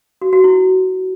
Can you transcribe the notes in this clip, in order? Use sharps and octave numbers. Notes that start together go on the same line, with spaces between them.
F#4
F#4
E4